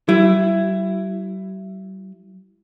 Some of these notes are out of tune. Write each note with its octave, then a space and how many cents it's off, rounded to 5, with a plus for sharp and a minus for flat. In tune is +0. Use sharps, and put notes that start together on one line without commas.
G3 -45 E4 +15